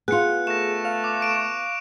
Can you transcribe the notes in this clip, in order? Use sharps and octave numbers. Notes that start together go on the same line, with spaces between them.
B3 F4 G#4 F#6 C#7
A3 A#6 E7
F5 F7
D6
C#6 D7 E7